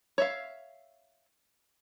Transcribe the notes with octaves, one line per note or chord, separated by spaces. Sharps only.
C#5 E5 F5